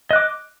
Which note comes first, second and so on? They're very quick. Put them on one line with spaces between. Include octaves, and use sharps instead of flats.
D#5 F#6 D6